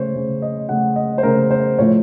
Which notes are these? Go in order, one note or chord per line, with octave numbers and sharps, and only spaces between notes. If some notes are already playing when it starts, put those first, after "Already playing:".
Already playing: C#3 A3 C5 C#5
C#3 A3
D#5
C#3 A3 F#5
D#5
C5
C#3 A3 A#4
C5
A2 F3 A3 C#5